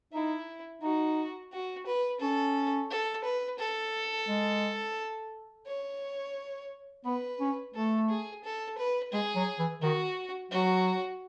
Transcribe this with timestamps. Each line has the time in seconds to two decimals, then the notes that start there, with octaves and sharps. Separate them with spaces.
0.13 D#4 E4
0.82 D#4 F#4
1.52 F#4
1.86 B4
2.20 C#4 A4
2.90 A4
3.24 B4
3.59 A4
4.28 G#3
5.66 C#5
7.05 B3 B4
7.40 C#4
7.74 A3 A4
8.09 G#4
8.44 A4
8.78 B4
9.13 G#3 G#4
9.36 F#3
9.59 E3
9.82 D#3 F#4
10.51 F#3 F#4